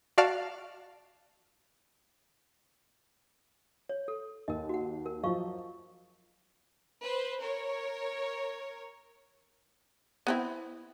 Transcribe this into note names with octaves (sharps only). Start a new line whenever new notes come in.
F#4 D5 F5 A5
C#5
A4
D#2 A#4 D#5
F#4 F#5
A#4
F3 F#3 D#5 F5 C#6
B4 C5
A#4 C#5
B3 C4 E4